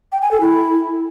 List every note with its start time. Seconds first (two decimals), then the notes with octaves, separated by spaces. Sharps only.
0.12 G5
0.22 G#5
0.31 A4
0.41 E4